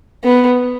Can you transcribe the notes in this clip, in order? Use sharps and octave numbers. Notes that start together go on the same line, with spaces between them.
B3